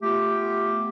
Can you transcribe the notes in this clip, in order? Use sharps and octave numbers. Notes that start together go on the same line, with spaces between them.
A3 B3 F4 G4